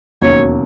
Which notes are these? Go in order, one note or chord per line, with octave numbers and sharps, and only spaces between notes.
E1 D#2 C#3 F#3 C#5